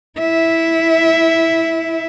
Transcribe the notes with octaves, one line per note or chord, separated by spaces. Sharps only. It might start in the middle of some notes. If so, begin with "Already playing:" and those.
E4 E5